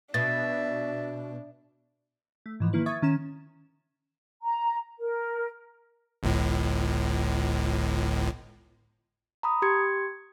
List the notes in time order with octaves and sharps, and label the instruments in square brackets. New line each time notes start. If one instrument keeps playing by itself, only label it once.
[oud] B2 [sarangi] D4 [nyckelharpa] E5 [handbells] A6
[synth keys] A3
G#2 E3 F3
D#3 A#3 E4 B4
E5 C#6 D#6 G#6 A6
D#3 C#4 A#5 E7
[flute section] A#5
A#4
[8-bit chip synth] G1 C#2 A2
[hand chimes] A#5 B5 D#6
G4 C6 G#6 C#7